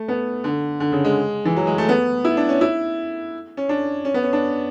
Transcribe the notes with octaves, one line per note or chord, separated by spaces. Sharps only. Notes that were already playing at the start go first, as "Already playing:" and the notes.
Already playing: A3
B3
D3
D3
C#3
G#3
E3
F#3
G#3
A3
B3
E4
D4
C#4
E4
C#4
D4
C#4
B3
C#4
D4